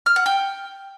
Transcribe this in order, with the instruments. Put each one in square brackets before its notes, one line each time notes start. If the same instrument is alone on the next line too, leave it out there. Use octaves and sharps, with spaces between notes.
[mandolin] F6
F#5
G5